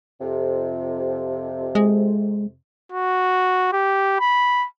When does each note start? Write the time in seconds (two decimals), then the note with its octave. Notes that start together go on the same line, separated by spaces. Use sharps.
0.21 F2 C3
1.75 G#3
2.92 F#4
3.73 G4
4.20 B5